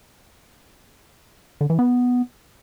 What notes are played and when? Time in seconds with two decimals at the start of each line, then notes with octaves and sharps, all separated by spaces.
1.61 D3
1.70 E3
1.79 B3